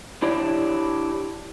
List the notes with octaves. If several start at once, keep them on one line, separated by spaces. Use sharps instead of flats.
D4 E4 G4 C#5 D5